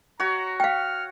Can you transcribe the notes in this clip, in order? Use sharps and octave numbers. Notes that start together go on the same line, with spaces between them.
F#4 C#5 A#5
F5 G5 F6